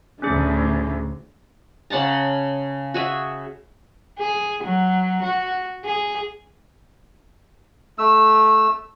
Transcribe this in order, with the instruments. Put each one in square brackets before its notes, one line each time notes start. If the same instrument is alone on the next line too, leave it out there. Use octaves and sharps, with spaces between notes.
[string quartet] D2 A2 D3 [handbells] C#4 D4 G#4
[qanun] C#3 F#5 A5 A#5
F#4 G#4 E5
[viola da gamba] G#4
F#3
F#4
G#4
[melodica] A3 E6